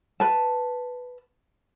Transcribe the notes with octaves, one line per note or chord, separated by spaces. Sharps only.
B4 A5